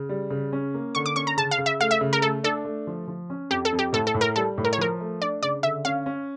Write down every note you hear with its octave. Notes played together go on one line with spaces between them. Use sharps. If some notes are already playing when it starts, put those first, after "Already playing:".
Already playing: C#3
G3
C#3
C#4
A#3
D3 C#6
D6
C#4 C#6
A#5
C#3 A5
F5
C#3
E5
A3 F5
E5
C#3
A#4
A3 A4
D4 A4
A3
F3
F3
C#4
F2 G4
A4
F2
G4
A2 A4
A4
A2
A#4
G3 A4
A2
A#4
C#5
F3 A#4
A3
D4 D5
C#3 D5
D3 E5
C#4 F5
C#4